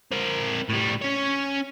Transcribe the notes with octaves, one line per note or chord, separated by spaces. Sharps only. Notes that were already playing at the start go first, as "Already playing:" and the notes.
C4 A#4
A2 G3
C#4 C#5